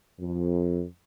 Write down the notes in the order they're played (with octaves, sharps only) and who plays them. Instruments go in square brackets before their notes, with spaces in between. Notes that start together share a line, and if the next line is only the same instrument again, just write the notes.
[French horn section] F2